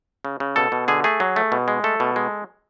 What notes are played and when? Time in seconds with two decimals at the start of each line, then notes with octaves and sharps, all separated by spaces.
0.25 C#3
0.40 C#3
0.56 B2 A4
0.72 B2
0.88 D3 G#4
1.04 A3 G#4
1.20 F#3
1.36 A3
1.52 B2
1.68 G#3
1.84 A3 A4
2.00 B2
2.16 G#3